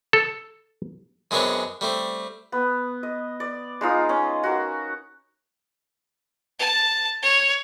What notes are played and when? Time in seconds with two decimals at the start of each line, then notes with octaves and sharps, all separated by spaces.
0.13 A4
1.31 F#2 G#3 B3 C4 D4 C#5
1.81 G3 A3 C4
2.52 B3
3.03 D#5
3.40 D5
3.81 G#3 D#4 F4 D#6
4.09 C#4
4.43 F#4 A#4
6.59 A5
7.22 C#5